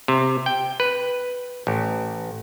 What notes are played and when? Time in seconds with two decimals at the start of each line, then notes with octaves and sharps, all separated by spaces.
0.08 C3
0.46 G5
0.80 B4
1.67 A1